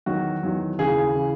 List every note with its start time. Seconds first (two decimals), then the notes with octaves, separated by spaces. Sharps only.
0.06 E2 D#3 F#3 F#4
0.43 E2 D#3 F#3
0.78 D#2 C#3 E3 G#4
1.15 C#3 E3